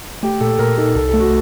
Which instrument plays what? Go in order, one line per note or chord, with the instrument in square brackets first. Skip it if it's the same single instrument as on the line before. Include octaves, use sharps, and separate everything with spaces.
[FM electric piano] A3 [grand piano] G4
[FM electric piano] A#2 [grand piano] A4
[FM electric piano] A#2 [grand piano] A#4
[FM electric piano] D#4 [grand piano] A4
[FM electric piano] C2 [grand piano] A4
[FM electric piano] A3 [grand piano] A4
[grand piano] F#4